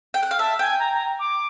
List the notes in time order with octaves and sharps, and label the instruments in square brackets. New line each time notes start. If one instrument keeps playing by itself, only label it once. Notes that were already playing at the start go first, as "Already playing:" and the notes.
[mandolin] G5
F#5
F5
[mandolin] E5 [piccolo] A5
[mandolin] G5 [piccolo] G#5
[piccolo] A#5
A#5
D6